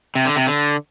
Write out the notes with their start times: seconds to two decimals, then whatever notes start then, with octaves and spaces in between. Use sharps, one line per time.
0.15 C3
0.25 D3
0.36 C3
0.47 D3